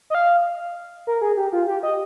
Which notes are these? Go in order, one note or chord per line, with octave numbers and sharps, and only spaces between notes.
D#5
F5
A#4
G#4
G4
F4
G4
D#5